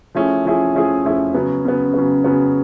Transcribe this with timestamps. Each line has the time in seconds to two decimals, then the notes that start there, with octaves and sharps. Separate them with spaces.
0.15 F3 A3 C#4 E4 G#4
0.45 F3 A3 C#4 E4 G#4
0.75 F3 A3 C#4 E4 G#4
1.05 F3 A3 C#4 E4 G#4
1.34 C#3 F#3 B3
1.65 C#3 F#3 B3
1.94 C#3 F#3 B3
2.24 C#3 F#3 B3